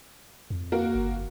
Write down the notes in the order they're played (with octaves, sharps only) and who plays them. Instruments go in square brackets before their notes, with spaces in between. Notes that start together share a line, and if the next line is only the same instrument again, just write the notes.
[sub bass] F2
[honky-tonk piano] A#3 F#4 A#4
[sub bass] G1